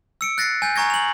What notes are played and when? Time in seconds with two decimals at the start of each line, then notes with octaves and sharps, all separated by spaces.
0.21 E6 C#7 D7
0.38 F#6 A6 A#6 C7 C#7
0.62 G#5 G6
0.76 G#5 A#5 C#6 G#6 A#6
0.90 F7 F#7